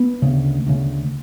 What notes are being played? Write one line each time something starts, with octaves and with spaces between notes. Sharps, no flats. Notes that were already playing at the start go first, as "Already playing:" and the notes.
Already playing: B3
D2 C#3
D2 C#3